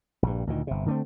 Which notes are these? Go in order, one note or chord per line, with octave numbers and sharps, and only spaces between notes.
A#1 G2
D2 A#2 D#3
G1 C3
D3 A3 C4